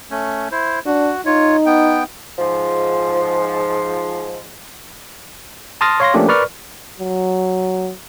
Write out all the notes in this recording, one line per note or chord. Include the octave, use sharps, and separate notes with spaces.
A3 C#4
E4 C5
D4 F#4
D#4 F4 C#5
B3 G5
G#2 F3
A5 C6 D#6 F6 A6 A#6
C#5 F5 C6 A#6
F3 A3 A#3 C#4 D4 G4
A#4 B4 D5 C#6 F6
F#3